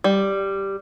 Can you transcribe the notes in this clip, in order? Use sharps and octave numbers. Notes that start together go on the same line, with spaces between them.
G3